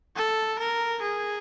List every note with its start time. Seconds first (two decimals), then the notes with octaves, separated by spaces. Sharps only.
0.16 A4
0.59 A#4
1.02 G#4